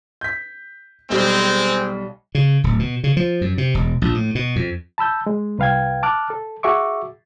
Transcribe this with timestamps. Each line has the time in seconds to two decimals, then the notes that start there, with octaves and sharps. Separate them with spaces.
0.21 G6 B6
1.10 B1 G3 G#3 C4
2.35 C#3
2.64 D1
2.79 B2
3.04 C#3
3.17 F3
3.41 F#2
3.58 C3
3.74 E1
4.02 A#1
4.14 A2
4.35 B2
4.56 F2
4.98 A5 B5 E6 G6
5.26 G#3
5.59 C2 B4 F5 G5 G#6
6.03 A5 D6 F6 F#6
6.30 A4
6.63 F#4 G#4 E5 C#6 D6